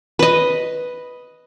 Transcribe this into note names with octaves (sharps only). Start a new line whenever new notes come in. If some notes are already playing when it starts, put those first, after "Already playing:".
B4 D#5